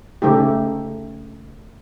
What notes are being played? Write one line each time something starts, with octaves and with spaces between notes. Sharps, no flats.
C#3 A3 D#4 G4